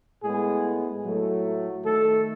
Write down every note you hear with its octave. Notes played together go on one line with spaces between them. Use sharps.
A2 G#3 B3 G#4
A2 F#3 A3
D#3 A3 A4